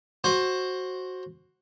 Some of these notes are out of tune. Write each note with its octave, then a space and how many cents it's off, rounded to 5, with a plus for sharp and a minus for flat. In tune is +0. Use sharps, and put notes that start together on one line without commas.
F#4 +0 C5 +15